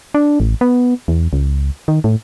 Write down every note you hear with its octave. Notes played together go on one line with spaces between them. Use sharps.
D4
A1
B3
E2
C#2
D#3
A2